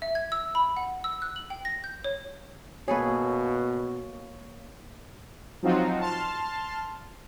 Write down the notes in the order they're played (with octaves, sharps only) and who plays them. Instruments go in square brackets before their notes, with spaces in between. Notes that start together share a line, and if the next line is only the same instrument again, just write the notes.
[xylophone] E5
G#6
E6
B5
F#5
E6
F#6
F#7
G5
A#6
G6
C#5
[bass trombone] B2 [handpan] A#3 C#5 [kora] G#4 A4 B4
[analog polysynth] F3 F#3 C4 D#4 F4 F#4
A5 C6 F6